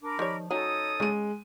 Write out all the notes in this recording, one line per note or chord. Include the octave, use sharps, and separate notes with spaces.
D4 A#4 B5 D6
D#3 F3 G3 C#5
F#3 C#4 D#4 A4 C#5 D#6
C#3 G#3 D#7